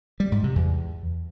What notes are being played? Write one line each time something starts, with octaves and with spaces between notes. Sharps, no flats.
G3
G#2
C3
E2